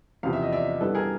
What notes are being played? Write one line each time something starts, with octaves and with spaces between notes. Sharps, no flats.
E2 C3 F3 F5
E5
D#5
D5 E5
G2 E3 G3 B3 A4 B4
G#4 A#4